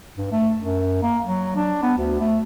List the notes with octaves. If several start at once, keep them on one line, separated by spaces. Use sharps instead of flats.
G2
A3
F#2
A#3
F#3
D4
B3
D2
A3